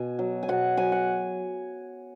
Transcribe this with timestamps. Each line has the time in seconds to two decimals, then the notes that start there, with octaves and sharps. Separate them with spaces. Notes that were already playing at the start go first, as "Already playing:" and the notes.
Already playing: B2 G#5
0.19 F#3
0.43 G#5
0.48 B2 F#5
0.77 F#3 G#5
0.92 F#5